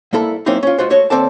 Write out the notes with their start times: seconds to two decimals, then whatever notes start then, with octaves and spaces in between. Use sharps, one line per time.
0.13 C2 A#3 E4 A4 B5
0.46 F#3 A#3 C4 C#4 D#4 E4
0.63 C#4 F4
0.78 G#3 F4 F#4 C5
0.90 A3 F#4 C#5 D#5
1.10 D#2 C#3 C4 A4 D5 A5